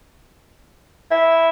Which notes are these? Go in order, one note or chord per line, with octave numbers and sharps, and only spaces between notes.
E4